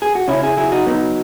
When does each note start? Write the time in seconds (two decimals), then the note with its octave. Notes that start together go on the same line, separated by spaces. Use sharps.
0.02 G#4
0.15 F#4
0.28 C#3 C#4 E4
0.43 E4 G#4
0.57 F#3 E4 G#4
0.72 D#4 F#4
0.87 F#3 B3 D#4